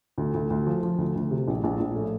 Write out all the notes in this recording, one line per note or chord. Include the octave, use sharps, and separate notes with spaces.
D2
D2
D2
F3
F3
D2
D2
C3
A#1
A#1
A#1
A2